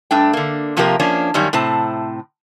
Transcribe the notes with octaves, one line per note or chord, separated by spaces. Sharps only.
G2 A3 D4 G5
D3 A#3
C3 F3 A#3 F4 G4 A#4
F3 A#3 C#4 D4
F#2 D#3 G3 A#3 C#4
A2 C3 C4 A5